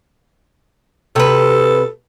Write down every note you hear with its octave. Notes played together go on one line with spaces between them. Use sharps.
C3 A4 B4